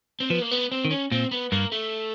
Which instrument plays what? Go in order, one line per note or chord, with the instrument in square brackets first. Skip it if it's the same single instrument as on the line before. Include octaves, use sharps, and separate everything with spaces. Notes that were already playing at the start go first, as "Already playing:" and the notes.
[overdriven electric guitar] C4
[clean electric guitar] F3 [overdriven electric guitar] B3
[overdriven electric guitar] A#3
B3
C4
[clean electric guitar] D#3
[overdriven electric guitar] C#4
[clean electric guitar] A#2 [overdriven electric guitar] C4
[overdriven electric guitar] B3
[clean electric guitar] G2 [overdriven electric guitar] A#3
[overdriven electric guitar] A3